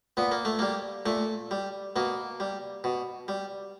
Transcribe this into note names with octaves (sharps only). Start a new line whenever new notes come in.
A#2 B3
A#3
A3
G3 A#3
A#2 A3
G3
B2 A#3
G3
B2
G3